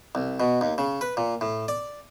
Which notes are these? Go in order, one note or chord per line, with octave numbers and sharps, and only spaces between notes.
C2
B2
D#2
C#3
B4
A#2
A2
D5